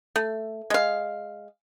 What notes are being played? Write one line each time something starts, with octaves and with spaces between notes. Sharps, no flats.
A3
G#3 F5